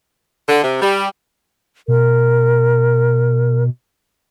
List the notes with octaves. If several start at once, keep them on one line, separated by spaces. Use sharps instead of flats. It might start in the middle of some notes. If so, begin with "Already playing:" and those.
D3
C3
G3
B2 A#4